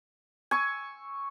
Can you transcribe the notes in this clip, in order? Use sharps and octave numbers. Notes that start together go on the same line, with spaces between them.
G#5 C#6 E6